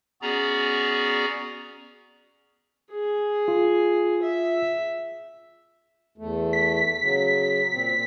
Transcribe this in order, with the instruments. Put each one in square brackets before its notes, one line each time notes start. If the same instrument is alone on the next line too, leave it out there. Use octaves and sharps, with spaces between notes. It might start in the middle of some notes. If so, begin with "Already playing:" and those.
[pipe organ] B3 C#4 F#4 G#4 D5 A#5
[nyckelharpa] G#4
[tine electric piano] F4
[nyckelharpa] E5
[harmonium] E2 A3
[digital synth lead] B6
[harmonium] C#3 F#3
A#2 C4